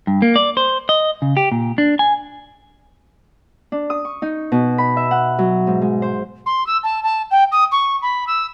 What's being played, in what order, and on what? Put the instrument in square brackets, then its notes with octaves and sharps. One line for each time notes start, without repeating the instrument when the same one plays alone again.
[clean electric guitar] G2
A#3
D5
C5
D#5
C#3
G4
A#2
D4
G#5
[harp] D4
D#6
C#6
D#4
B2
B5
E5
F#5
F#3
G#2
G#3
C5
[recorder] C6
E6
A5
A5
G5
D#6
C#6
B5
E6